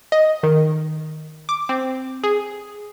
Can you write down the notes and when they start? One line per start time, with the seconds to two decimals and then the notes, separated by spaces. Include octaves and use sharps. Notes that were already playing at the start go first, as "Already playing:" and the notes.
0.12 D#5
0.43 D#3
1.49 D6
1.69 C4
2.23 G#4